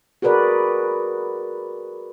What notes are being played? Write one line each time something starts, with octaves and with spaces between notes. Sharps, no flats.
F#4 G#4 A#4 B4 D5